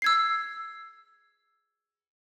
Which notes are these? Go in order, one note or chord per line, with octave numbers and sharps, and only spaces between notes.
E6 G#6 C7